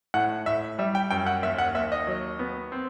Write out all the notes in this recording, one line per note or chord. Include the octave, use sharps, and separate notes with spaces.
A2 F#5
A2 E5
G3 E5
G5
F#2 G5
F#5
D#2 E5
F#5
D#2 E5
D#5
F#3
B3
C4